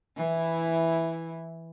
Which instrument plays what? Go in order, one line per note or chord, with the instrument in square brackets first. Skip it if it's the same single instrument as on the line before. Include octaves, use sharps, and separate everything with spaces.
[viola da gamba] E3 E4